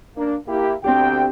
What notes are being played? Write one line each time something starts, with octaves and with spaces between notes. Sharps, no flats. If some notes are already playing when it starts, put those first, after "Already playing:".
A#3 D4
A#3 E4 G4
D2 C4 D4 G4 G5